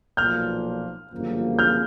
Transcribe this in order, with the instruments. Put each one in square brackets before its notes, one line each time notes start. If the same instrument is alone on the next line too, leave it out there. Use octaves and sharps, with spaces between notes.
[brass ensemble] B1 A#2 F3 A#3 [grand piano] F6 G6
[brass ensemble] G1 F#2 C#3 F3 A#3
[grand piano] F6 G6